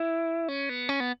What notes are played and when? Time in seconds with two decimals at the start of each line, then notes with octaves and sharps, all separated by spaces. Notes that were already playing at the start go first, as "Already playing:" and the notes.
Already playing: E4
0.48 C#4
0.69 B3
0.89 C#4
1.00 B3